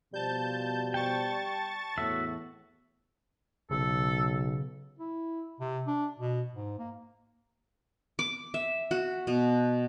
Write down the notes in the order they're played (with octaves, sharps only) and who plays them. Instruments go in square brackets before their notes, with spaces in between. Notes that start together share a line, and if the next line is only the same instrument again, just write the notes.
[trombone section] B2 F3 [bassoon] G3 [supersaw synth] A5 G6
[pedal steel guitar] G5 [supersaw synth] A5 C#6 A6
[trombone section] E2 A2 [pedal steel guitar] F#4 E5
[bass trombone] B1 [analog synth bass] C#3 [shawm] A4
[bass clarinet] E4
C3
D4
B2
G#2
A#3
[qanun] D6
E5
F#4
B2